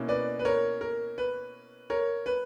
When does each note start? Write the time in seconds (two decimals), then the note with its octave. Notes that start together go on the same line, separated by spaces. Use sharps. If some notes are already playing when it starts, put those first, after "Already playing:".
Already playing: B2 A#3 C#4 E4
0.08 B4 D5
0.39 B4
0.45 A#4 C#5
0.81 A#4
1.18 B4
1.90 A#4 C#5
2.26 B4